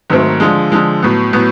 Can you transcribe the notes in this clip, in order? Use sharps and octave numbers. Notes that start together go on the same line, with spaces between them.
G#2 D#3 F#3 A3 C4
D3 F3 G#3
D3 F3 G#3
A2 F#3 B3
A2 F#3 B3